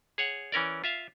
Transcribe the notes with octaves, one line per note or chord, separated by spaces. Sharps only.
G#4 C#5 F#5
E3 C#4 A#4 D5
F4 E5 F5